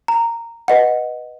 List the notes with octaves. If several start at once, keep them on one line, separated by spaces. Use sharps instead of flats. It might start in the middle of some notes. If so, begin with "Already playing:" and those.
A#5
B4 D#5 F#5